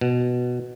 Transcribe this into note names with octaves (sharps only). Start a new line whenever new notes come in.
B2